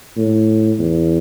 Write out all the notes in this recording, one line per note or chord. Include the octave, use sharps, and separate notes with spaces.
A2
E2